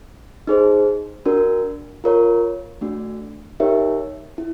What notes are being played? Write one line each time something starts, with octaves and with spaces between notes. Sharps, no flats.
D#4 G#4 C5
D4 F#4 A#4
F4 A#4 C#5
A3 D4 F#4
D#4 G4 A#4 C#5 E5
E4